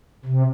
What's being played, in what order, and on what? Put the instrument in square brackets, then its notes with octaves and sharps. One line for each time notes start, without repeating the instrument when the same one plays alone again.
[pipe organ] C3